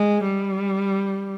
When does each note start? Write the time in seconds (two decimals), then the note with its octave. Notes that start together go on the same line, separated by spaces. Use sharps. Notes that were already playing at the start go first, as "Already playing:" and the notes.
Already playing: G#3
0.24 G3